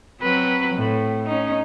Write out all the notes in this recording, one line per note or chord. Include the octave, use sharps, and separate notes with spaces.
F#3 C4 B4
A2
C#4 D#4